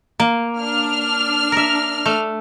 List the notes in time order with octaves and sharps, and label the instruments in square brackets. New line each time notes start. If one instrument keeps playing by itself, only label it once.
[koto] A#3
[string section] D4 F6
[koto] A#4 E5
A3